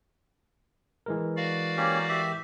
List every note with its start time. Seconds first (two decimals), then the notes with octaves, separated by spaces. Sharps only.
1.06 E3 G#3 A#4
1.37 F#4 D5 F5
1.77 A#3 C#4 G4
2.09 G4 E5